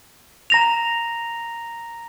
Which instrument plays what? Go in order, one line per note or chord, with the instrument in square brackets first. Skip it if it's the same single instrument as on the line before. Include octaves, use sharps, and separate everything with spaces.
[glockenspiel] A#5 A#6 F7